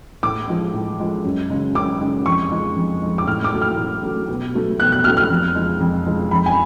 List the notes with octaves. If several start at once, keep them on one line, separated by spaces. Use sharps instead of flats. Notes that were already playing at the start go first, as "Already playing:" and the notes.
A2 D6
F3 G#3
A2
F3 G#3
F#2
C#3 G#3
F#2 D6
C#3 G#3
F2 C#6
F3 G#3
F2
F3 G#3
D6
A2 F6
D6
F#3 A3
F6
A2
F#3 A3
B2
F#3 A3
B2 F#6
F#6
F#3 A3 F6
F6
F2
F3 G#3
F2
F3 G#3
F2 B5
G#5